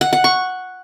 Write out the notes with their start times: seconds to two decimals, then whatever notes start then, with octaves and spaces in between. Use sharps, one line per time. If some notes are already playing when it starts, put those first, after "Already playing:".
0.01 F#5
0.13 F#5
0.24 C#6